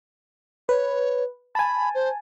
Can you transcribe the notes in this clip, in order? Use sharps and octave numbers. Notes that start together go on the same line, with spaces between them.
B4 C#5
G#5 A5 B5
C5